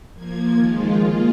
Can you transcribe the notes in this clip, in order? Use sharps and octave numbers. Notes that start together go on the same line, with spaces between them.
F3 A#3 G#6
D#3 F3 G#3 F4
A#3 F4 G#4